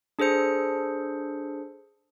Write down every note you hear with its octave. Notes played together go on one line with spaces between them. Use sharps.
D4 G#4 A4 C5 C#7